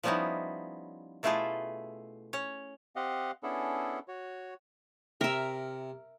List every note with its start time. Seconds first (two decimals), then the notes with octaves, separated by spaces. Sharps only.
0.03 F3 G3 B3 C#4 D#4 E4
1.23 B2 A3 E4 F4 G#4 A4
2.33 C#4 C#5
2.96 C4 G4 D#5 F5 F#5
3.43 B3 C#4 D4 E4 G#4 A4
4.08 F#4 C#5
5.21 C3 A#4 E5